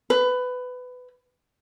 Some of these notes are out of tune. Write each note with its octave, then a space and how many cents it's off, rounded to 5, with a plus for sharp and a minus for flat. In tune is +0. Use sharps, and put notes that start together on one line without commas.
B4 +20